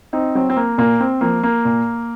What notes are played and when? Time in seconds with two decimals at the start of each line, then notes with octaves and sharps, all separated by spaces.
0.13 C4 D#4
0.35 F#3 C4
0.50 C4
0.57 A#3
0.78 A#2 A#3
1.00 C4
1.21 F3 A#3
1.43 A#3
1.65 A#2